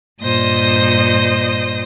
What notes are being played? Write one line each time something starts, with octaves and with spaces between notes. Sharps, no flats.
G2 A#2 C5 D#5 D#6